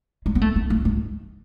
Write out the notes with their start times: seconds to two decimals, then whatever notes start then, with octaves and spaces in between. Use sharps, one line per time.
0.26 G#3
0.35 B3
0.42 A3
0.56 B3
0.70 A3
0.85 G#3